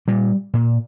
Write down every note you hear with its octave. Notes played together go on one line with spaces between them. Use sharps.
A#2 G3
A#2